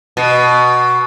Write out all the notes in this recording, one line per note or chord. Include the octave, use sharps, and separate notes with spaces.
B2